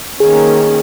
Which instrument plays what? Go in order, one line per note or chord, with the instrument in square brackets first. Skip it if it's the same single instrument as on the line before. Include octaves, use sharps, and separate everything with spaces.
[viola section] D#3 A#3 C#4 [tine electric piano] G#4